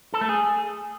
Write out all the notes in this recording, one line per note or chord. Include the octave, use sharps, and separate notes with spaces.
A4
A3
G#4